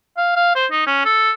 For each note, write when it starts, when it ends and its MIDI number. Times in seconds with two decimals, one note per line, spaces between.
0.17 0.34 77
0.36 0.55 77
0.55 0.66 72
0.72 0.84 63
0.87 1.02 61
1.05 1.31 69